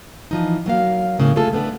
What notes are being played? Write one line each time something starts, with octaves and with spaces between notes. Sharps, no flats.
E3 F3 D#4
F#3 A#3 F5
A2 C#3 G#3 A#3
A3 F4 G#4 A4
A3 B3 D4